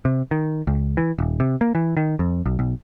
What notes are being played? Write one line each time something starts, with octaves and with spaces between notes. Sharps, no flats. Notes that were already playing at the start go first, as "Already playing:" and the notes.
C3
D#3
C#2
E3
D#1
C3
A#3
E3
D#3
F2
B1
B1